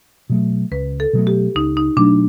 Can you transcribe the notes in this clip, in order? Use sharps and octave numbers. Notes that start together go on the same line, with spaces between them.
B2 F#3 A3
C#2 B4
A4
B2 F#3 A3
G4
C#2 D#4
D#4
B2 F#3 A3 D4